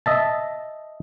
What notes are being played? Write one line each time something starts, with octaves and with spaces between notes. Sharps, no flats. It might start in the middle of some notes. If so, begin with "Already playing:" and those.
D#5 E5 A5